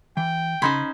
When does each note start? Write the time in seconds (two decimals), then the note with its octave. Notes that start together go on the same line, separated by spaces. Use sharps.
0.17 E3 G5
0.62 C#3 C#4 D#4 C5 B5 C6